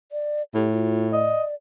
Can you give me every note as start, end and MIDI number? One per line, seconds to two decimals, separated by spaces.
0.12 0.42 74
0.54 1.39 45
0.54 0.71 67
0.72 1.09 65
1.12 1.55 74
1.12 1.43 75